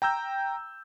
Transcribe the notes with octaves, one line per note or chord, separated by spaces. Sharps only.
G5 A#5 E6 G6